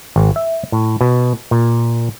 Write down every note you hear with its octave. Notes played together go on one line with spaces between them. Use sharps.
G#1
E5
A2
B2
A#2